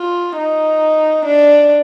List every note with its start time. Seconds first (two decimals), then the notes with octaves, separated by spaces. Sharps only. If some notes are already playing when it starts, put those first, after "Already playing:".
Already playing: F4
0.37 D#4
1.26 D4